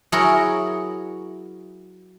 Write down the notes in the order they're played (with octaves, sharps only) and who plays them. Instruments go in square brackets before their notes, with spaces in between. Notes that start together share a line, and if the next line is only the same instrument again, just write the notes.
[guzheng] F#3 E4 G#4 A#4 C#5